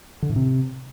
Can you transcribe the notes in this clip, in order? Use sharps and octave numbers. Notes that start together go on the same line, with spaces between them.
D3
A2
C3